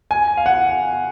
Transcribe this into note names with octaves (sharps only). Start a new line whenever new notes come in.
G#5
F5
F#5